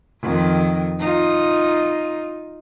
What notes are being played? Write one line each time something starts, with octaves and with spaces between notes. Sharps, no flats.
F2 D#3
D#4 F4